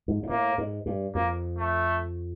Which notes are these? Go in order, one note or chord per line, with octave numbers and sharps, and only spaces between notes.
G#2
G#2
A2 A#3
G#2
G2
F2 A#3
A3